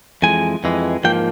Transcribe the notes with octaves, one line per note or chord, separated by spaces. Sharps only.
F2 E3 G#3 G#5
F2 E3 G#3
G#2 F3 A#3 G5